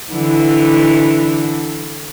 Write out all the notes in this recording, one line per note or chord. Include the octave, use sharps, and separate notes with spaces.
D3 E3